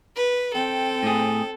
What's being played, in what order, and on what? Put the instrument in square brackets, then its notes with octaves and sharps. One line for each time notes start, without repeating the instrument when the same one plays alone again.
[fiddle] B4
[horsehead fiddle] C4 G5 [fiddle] A4
[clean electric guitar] A2 G#4